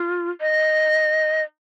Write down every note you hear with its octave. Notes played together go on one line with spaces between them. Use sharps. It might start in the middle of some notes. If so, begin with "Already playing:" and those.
Already playing: F4
D#5